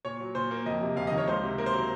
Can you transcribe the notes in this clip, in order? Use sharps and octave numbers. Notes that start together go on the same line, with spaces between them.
A#2 C#5
F#3
A#2 C5
A#3
F2 D#5
C3
F2 F5
D#5
D#3
C#5
C#2 C5
C3
A#3 A#4
C5
F#3 A#4